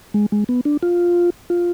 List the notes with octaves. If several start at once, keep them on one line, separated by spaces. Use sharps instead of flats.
G#3
G#3
B3
D4
F4
F4